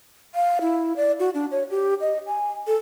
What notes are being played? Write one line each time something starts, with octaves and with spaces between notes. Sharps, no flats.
F5
E4
D5
F#4
D4
C#5
G4
D#5
G#5
A4